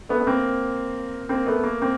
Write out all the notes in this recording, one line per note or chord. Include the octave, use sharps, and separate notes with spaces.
A3 B3
B3
A#3 C4
A#3 C4
A3 B3
A#3
A#3 C4